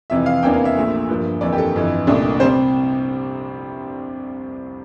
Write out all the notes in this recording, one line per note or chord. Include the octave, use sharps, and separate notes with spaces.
F2 C3 E3 E5
F5
E2 C3 E3 A#3 D4 G5
F5
E5
A#1 A#2 A3
G2 F3 A#3
G1 F2 E3 A#3 D5
G4
A4
G1 F2 E3
C2 A#2 A3 D4
C3 G3 C4 C5